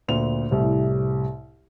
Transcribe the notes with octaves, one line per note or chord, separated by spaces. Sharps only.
D2 A#2 F7
C2 A2 C3